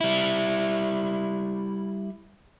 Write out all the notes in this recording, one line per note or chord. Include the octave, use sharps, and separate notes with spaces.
G3 E4